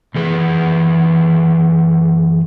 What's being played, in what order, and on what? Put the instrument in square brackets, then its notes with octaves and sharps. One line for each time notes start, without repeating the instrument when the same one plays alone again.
[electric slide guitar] F#2 E3 G#4 B4